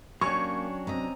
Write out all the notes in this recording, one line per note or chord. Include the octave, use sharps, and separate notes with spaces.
F#3 A#3 C#4 D4 G4 C#6 G#6
C3 D#5 A#5